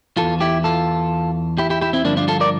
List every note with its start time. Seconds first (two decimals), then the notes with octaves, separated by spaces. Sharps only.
0.17 E2 E3 F4 A4
0.41 E4 G4
0.64 F4 A4
1.58 E4 G4
1.70 E4 G4
1.81 E4 G4
1.93 C4 E4
2.05 G2 D3 F3 A#3 D4
2.17 D4 F4
2.28 F4 A4
2.40 A#4 D5